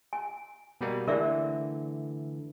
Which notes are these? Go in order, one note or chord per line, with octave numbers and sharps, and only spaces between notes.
G#5
B2 G3 A#3
D3 E3 A3 A#4 D5 E5